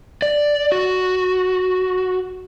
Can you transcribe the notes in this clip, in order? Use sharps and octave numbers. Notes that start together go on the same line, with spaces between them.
D5
F#4